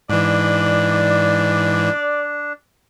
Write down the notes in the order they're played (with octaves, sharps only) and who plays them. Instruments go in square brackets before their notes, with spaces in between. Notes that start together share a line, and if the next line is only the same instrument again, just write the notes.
[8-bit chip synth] G#2 E3 [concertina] D4 [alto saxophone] D5